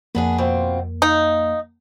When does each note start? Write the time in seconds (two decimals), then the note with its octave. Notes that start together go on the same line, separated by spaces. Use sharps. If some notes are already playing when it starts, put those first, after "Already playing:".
0.15 F2 A#3 B3 D4 G#4
0.38 B2 C4 F4
1.02 D#4 F5